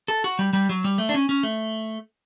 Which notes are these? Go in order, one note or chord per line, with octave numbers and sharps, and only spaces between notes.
A4
F#4
G3
G3
F#3
G3
A3
D4
C#4
C#4
A3